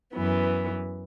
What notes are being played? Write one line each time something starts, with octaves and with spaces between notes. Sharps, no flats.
F#2 E3 B3